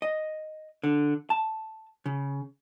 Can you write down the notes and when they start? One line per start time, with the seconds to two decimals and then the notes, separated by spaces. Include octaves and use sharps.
0.02 D#5
0.83 D3
1.30 A5
2.06 C#3